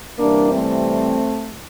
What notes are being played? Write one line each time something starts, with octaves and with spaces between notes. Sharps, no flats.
C3 E3 G3 A#3 D4
A3 C4